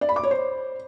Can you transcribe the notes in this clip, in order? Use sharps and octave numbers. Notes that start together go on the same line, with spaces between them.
D5
B5
D6
C#5
C5